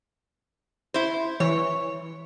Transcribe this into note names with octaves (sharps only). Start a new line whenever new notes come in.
E4 C5
E3 C#5